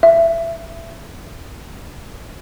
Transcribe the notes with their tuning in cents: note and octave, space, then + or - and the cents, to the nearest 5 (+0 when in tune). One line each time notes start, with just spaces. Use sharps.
E5 +20